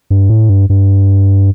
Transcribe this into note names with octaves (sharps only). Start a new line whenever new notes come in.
G2
A2
G2
G2